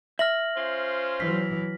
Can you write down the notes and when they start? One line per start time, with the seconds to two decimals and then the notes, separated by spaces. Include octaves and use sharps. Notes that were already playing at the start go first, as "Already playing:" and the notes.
0.19 E5 F6 A#6 F#7
0.56 C#4 F4 C5
1.20 E3 F#3 B6